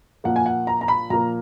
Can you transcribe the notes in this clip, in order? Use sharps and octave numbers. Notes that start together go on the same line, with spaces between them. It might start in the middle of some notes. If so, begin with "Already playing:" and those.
A#2 F3 A#3 F#5
G#5
F#5
A#5
A#5
B5
A#2 F3 A#3 A#5